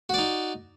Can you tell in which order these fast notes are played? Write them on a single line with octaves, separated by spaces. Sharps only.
F#4 D5 D#4